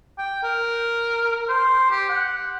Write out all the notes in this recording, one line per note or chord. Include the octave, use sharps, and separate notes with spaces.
G5
A#4
C5
G4
F#5